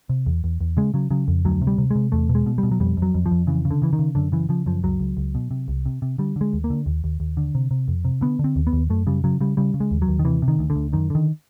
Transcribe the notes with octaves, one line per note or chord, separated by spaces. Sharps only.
C3
E2
E2
E2
C#3 G#3
C#3 F#3
C#3 F#3
F2
D2 F#3
C3
G3
C3
C3 G#3
E2 A3
B2
G#3
B2
G3
B2
F#3
F2 G3
F2
F#3
F2
F3
F2
C#3 E3
C#3
D3
C#3 E3
D#3
C#3
F#2 D3
C#3 E3
C#3 F3
F#2 F3
C#2 F#3
C#2
C#2
B2
C3
C2
C3
C3
D3 G3
D3 G#3
D#2
A#3
D3
D#2
D#2
D#2
D3
C3
C3
F2
C3
D3 B3
D3
C4
D#2
B3
D#2
F#2 A3
C#3 G3
C#3 F#3
C#3 G3
C#3 G3
C#3
G#3
D#2
F#3
D#2
D#3
C3 E3
C3
D#3
D2
D3
D2
F#2 D#3
D3 D#3